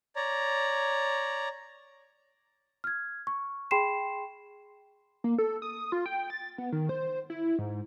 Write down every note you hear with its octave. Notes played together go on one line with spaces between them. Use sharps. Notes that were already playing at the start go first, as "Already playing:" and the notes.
C#5 D5 A#5
F6 G#6
C#6
G#4 G5 B5 C6 C7 E7
A#3
A4
D#6
F4
G5
A6
B3
D#3
C5
E4
G#2